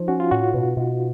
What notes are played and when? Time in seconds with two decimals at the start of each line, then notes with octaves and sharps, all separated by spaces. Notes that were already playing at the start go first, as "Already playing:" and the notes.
Already playing: F3 D#4
0.08 C#4 F#4
0.20 F4
0.31 A2 F#4
0.54 B2
0.77 B2